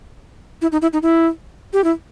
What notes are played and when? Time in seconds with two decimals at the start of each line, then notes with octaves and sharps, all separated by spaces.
0.62 E4
0.72 D#4
0.82 E4
0.93 D#4
1.02 E4
1.73 G4
1.84 E4